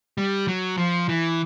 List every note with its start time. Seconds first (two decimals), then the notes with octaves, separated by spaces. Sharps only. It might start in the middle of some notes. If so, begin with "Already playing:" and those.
0.18 G3
0.48 F#3
0.78 F3
1.09 E3